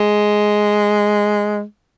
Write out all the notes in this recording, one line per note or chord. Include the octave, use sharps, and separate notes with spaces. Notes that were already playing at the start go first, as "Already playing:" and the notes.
Already playing: G#3